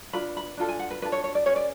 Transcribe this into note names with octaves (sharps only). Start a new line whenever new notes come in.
D4 F4 B4 B5
B5
D4 F4 A4
G#5
F#5
B4
D4 F4 A4 B4
C#5
C#5
D5
C#4 G#4 B4 C#5
D5